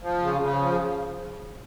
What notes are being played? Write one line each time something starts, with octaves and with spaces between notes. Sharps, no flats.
F3
C#3
C#3
F3